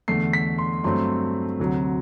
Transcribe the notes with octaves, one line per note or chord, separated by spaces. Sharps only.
E2 D3 A3 C7
B6
C6
G2 F#3 A3 C4 C6
D2 C3 F#3